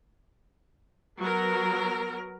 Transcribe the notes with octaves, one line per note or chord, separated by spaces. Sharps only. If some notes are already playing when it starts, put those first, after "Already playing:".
F#3 B3 A#4